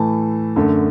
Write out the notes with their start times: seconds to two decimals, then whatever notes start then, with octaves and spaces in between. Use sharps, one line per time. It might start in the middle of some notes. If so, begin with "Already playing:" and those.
Already playing: A2 E3 A3 A5
0.56 F#2 D3 A3